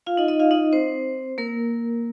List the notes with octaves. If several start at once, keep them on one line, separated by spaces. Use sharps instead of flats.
F4 F5
D#4 D#5
D#4 D#5
F4 F5
D#4 D#5
C4 C5
A#3 A#4